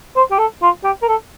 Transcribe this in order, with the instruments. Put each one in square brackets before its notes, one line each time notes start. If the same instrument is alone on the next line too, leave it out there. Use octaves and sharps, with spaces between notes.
[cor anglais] C5
G4
A4
F4
G4
A#4
A4